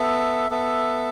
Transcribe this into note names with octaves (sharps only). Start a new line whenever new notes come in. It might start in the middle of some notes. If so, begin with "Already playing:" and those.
Already playing: B3 A4 E5
B3 A4 E5